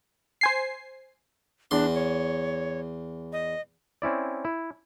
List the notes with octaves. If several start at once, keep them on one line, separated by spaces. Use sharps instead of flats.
C5 G#5 C7
E2 D4 C6
C#5
D#5
C4 C#4 E4 D5
E4